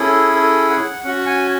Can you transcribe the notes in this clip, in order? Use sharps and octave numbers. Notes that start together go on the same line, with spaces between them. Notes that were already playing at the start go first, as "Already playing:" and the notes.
Already playing: C#4 E4 G#4 A4
A4
F#5
C#4 F#4 F#5
G#5